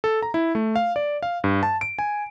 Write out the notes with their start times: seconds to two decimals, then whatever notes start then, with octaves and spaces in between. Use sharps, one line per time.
0.04 A4
0.22 A#5
0.34 E4
0.55 A3
0.76 F5
0.96 D5
1.23 F5
1.44 G2
1.63 A5
1.81 D7
1.99 G#5